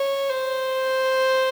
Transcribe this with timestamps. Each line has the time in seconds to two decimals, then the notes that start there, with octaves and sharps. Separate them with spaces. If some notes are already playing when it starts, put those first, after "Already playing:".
Already playing: C#5
0.29 C5